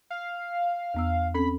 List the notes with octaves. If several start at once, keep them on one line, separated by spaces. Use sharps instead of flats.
F5
E2 B3 E6
C4 C#4 A4 B5